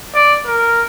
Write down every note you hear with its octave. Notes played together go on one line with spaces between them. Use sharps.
D5
A#4